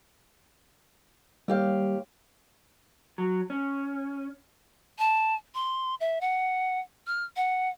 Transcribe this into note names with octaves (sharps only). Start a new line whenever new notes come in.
D#2 G3 G4 F5
F#3
C#4
A5
C6
E5
F#5
F6
F#5